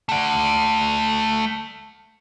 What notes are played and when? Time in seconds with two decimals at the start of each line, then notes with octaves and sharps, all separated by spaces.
0.09 A3 F#5